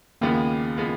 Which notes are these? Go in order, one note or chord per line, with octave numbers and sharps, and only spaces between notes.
D#2 C#3 F3 G#3 A#3 B3
C#3 F3 G#3 B3